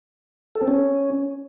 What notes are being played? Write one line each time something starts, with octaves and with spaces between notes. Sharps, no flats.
A4
C4
C#4